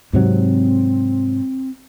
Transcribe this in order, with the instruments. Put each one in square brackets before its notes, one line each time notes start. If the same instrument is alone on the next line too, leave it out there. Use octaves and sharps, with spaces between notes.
[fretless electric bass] G#2 C3 F#3 [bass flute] C4